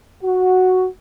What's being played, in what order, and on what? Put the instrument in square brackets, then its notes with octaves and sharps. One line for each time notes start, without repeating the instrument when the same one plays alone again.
[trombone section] F#4